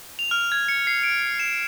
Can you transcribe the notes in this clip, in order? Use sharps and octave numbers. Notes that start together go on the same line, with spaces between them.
F7
F6
G#6
C#7
C7
D7
E7